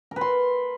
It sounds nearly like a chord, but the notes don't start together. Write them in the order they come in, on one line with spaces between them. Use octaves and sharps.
A#4 B4 C6